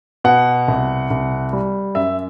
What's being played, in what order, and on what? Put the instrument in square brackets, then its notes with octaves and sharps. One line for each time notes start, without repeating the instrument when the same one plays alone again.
[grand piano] B2 F#5
C2
C2
G3
F#2 E5